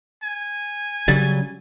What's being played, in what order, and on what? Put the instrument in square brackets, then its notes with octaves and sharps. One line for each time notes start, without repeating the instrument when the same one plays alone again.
[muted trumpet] G#5
[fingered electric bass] C#3 F#3 G3 [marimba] A6